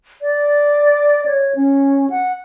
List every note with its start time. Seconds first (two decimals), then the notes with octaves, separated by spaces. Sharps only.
0.22 D5
1.26 C#5
1.55 C#4
2.10 F#5